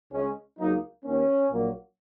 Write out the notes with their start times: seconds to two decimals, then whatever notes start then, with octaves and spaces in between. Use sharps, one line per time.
0.11 C#2 C#3 G#3 C#4
0.59 C#2 C#3 F#3 A#3 D#4
1.04 D#2 D#3 A#3 C#4
1.51 A#1 A#2 F#3 A#3